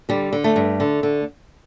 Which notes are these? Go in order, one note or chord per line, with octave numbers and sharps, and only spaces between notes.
D3 G3
D3
A3
G2
D3
D3